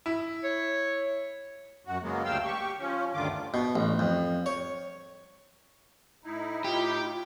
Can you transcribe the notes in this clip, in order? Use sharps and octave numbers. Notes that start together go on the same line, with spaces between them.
E4
C#5
F#2 F#4
C#3 F#3 G#3 A#3 B3
D2 G2 F5 G5 E6
G4 C#6
F3 C#4
D2 G2 D3 D#3 F4 D6
B2
A1
F2
C#5
A2 D#4 E4
F4 G4